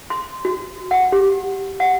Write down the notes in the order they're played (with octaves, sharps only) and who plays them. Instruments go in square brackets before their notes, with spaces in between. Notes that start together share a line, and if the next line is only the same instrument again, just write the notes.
[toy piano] C6
F#4
F#5
G4
F#5